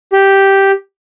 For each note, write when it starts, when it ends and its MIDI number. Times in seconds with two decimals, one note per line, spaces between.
0.13 0.71 67